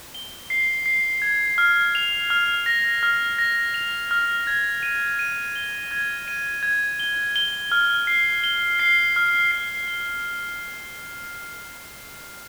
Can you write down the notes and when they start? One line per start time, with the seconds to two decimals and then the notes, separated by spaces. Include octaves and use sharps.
0.14 G7
0.50 C7
0.86 C7
1.22 G#6
1.58 F6
1.95 F7
2.30 F6
2.66 A#6
3.03 F6
3.38 A#6
3.74 F7
4.11 F6
4.47 G#6
4.83 D#7
5.19 D#7
5.56 G7
5.91 G#6
6.28 D#7
6.63 G#6
6.99 G7
7.36 G7
7.72 F6
8.07 C7
8.44 G7
8.80 C7
9.16 F6
9.51 C7
9.88 G7